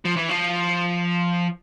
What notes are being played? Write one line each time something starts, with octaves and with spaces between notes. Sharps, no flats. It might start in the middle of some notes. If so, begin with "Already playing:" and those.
F3
E3
F3